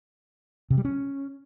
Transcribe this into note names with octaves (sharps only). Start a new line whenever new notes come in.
C3
G3
C#4